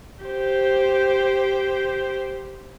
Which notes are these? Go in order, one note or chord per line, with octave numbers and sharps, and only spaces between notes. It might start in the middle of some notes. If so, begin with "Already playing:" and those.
G4 C5